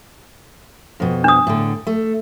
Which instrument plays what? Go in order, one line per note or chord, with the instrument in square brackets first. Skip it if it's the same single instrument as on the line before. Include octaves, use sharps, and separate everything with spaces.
[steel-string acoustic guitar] F2 B2
[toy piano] D4 D#6
[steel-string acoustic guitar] A2 D3
A3